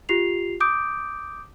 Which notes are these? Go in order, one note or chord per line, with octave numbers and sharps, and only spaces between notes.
F4 G4 C7 F7
D6 D#6 G6 D7